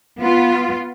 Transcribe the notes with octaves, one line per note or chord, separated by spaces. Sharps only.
B3 F4